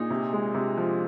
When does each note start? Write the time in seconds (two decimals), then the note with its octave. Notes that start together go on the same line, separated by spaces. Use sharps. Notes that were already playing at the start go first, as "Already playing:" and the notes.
Already playing: A#2 D#4 G#4
0.10 C3
0.33 G#3
0.54 C3
0.78 F3